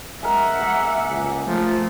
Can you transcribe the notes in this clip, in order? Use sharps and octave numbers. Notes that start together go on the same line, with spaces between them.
G#3 A#4 E5 F#5
G#3 A#3
C#2
F3 A3